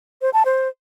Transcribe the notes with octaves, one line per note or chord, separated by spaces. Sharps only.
C5
A5
C5